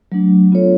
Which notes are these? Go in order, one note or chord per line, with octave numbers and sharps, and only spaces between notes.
F#3 A3 D4
B3 F4 A4 C#5